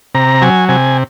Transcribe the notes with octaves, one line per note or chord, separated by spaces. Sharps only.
C3 A#5
F#3 G#5
C3 G#5